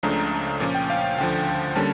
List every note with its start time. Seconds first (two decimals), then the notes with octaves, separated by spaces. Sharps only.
0.03 C#2 C#3 F3 A3 D4 A#5
0.60 A#2 F3 C#4 D6
0.75 G5
0.90 F5
1.04 F5
1.18 D2 D3 F3 G5
1.76 D3 G3 A#3 C#4 A5